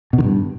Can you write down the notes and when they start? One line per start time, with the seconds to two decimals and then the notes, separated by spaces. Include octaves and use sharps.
0.13 B2
0.18 D#3
0.24 G2